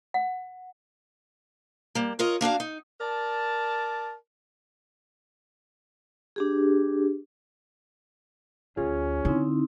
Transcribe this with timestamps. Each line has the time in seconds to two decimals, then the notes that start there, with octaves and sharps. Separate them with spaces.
0.14 F#5
1.95 G3 A#3
2.19 F4 A#4 C#5 D#5
2.41 A#3 D4 F#4 F5
2.60 D#4
3.00 A#4 D5 A5
6.36 D4 G4 G#4
8.77 D2 C#4 F4 G#4
9.25 D3 C4 D#4 E4